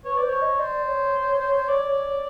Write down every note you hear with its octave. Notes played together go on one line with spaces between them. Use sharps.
B4 C#5
D5
C5
C#5
D#5
C5 D5
C#5
D5